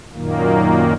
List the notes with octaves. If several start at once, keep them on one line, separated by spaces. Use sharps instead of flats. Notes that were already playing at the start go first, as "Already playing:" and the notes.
F#2 A#2 D#3 A#3